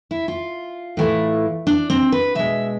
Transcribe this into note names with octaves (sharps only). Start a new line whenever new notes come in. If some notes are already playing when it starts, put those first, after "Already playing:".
E4
F4
A2 E3 A3
D4
C4
B4
B2 G#3 E5